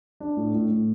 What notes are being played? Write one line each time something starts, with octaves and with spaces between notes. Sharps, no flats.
D4
A2
A2
A2